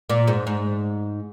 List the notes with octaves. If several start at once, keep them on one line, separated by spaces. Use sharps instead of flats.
A#2
G#2
G#2